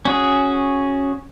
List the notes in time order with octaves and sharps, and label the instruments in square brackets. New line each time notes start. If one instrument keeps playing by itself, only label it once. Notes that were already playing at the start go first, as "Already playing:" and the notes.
[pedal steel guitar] C#4 F#4 G#4